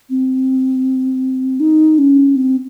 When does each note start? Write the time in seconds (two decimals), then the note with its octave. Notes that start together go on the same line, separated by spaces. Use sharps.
0.10 C4
1.60 D#4
1.98 C#4
2.36 C4